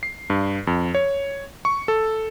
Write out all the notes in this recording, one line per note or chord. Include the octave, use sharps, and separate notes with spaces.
C7
G2
F2
C#5
C#6
A4